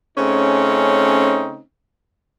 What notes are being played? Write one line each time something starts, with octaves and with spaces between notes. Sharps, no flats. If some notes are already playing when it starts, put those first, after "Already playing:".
C#3 A3 C4 C#4 D#4